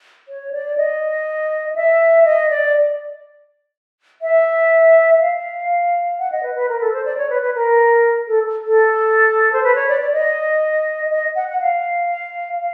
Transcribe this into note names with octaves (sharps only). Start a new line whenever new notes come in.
C#5
D5
D#5
E5
D#5
D5
E5
F5
F#5
D#5
B4
B4
A#4
A4
C5
D5
C#5
B4
B4
A#4
A4
A4
C5
B4
C#5
D5
D5
D#5
D#5
F#5
F#5
F5
F5